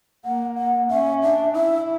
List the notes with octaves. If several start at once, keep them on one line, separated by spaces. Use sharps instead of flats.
A#3 F#5
F#5
C#4 E5
D4 E5
E4 E5